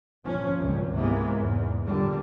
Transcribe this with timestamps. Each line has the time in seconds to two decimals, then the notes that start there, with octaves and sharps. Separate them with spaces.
0.24 G1 A#2 F3 C#4
0.58 G#1 C#2 G2
0.94 G#2 C3 E3 G#3 A#3 B3
1.39 E2
1.85 A#2 D3 G3